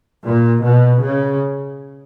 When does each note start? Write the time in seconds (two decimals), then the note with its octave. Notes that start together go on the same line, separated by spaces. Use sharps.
0.24 A#2
0.63 B2
1.02 C#3